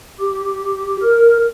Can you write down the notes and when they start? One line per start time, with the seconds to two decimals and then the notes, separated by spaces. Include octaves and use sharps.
0.20 G4
1.02 A#4